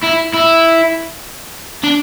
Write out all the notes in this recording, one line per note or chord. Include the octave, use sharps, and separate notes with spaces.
E4
E4
D4